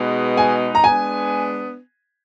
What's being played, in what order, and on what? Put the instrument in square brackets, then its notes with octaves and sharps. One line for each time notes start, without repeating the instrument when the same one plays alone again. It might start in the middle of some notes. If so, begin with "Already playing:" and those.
Already playing: [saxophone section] B2 G#3 D#4 G#4 B4
[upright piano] G#5
A#5
[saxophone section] G#3 B3 D4 [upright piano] G#5